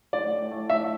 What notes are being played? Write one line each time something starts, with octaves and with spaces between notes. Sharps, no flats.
A2 D5
A2
A3
A3 E5